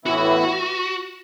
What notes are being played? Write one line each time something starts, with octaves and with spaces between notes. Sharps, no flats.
A2 E3 B3 E4 F#4